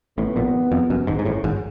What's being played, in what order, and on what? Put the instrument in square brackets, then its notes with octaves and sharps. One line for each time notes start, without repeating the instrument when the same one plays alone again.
[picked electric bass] A1 A2 [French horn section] C3 D#3 G#3 B3
[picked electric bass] A#1 A#2
F2
F#1 F#2
G#1 G#2
G#2
A1 A2
G#1 G#2